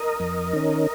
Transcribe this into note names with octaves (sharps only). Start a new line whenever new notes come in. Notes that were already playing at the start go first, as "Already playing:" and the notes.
Already playing: A#4 D#5
F2
D#3 C#4